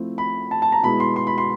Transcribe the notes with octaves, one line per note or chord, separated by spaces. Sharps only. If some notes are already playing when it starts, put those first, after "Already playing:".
Already playing: F3 A3 C4 E4
B5
A5
A5
A#5
B2 G#3 B3 E4 B5
C6
C6
B5
C6